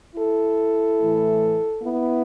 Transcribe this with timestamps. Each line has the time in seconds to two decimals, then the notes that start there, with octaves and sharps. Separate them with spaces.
0.15 E4 A4
0.98 A2 E3 A3
1.82 B3 E4